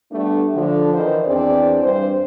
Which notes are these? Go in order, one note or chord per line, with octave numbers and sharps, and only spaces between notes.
G3 A3 B3 D4
D3 F3 D4
D#3 E3 C5
E2 E3 C4 D4 G#4 D5
G2 C5